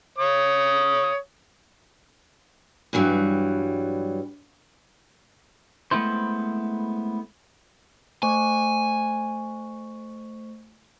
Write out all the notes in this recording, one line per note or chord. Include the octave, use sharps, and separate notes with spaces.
C#5 D#6
G2 E3 F#3 G3
G#3 A3 B3 C4 E4 C5
A3 C5 G#5 C#6